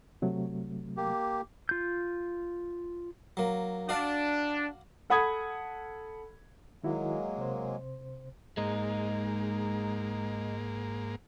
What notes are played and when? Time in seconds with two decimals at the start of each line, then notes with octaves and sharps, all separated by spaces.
0.22 C3 F#3 A3
0.97 A#3 G4
1.69 F4 G6
3.37 F#3 A#3
3.89 D4 F#4 D5 F5
5.10 A4 F#5 B5 D#6 G#6
6.84 D#3 F#3 G#3 A#3 E4 F#4
7.38 C3 C5
8.57 G#2 G#3 A#3 D#4